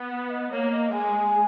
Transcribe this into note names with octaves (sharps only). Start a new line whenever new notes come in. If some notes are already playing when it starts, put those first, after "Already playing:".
Already playing: B3
F#5
D#5
A#3 C#5
D#5
G#3 G#5